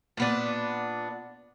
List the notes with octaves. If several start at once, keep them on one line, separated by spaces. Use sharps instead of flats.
A#2 B3 D4